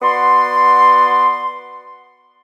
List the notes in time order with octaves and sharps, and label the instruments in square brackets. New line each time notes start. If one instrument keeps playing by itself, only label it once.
[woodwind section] B3 F#4 D5 C6